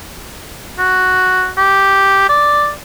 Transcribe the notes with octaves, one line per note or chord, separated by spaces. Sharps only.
F#4
G4
D5